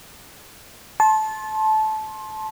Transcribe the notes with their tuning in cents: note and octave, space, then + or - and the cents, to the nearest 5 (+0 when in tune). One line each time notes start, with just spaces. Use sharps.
A5 -20 C6 +25